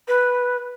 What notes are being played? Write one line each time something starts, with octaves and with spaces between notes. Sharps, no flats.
B4